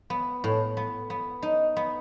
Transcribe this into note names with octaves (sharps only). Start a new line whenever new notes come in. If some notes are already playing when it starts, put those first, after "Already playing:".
B3
A2
B3
B3
D#4
B3